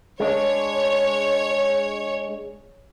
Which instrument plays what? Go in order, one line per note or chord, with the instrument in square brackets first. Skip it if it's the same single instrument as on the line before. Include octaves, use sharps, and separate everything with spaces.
[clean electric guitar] G#3 D4 [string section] C#5